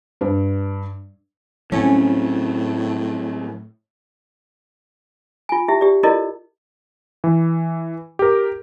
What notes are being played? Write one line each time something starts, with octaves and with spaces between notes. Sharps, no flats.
G2
A2 F#3 C4 C#4
F4 G#5
E4 G4 E5
G4 D5
E4 F4 A4 A#4 D5 D#5
E3
G4 A#4